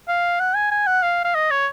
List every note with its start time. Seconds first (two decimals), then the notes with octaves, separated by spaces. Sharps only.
0.08 F5
0.40 F#5
0.55 G#5
0.71 G#5
0.87 F#5
1.03 F5
1.25 F5
1.35 D#5
1.51 C#5